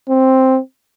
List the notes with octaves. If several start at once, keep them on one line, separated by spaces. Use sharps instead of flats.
C4